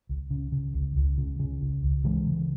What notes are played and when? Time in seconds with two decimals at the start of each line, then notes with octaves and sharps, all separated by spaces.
0.09 C#2
0.30 C#3
0.52 C#3
0.74 C#2
0.96 C#2
1.18 C#3
1.39 C#3
1.61 C#2
1.83 C#2
2.04 C#3 E3 G#3
2.26 C#3